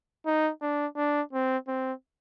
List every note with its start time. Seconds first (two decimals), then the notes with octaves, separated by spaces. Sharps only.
0.26 D#4
0.62 D4
0.96 D4
1.33 C4
1.68 C4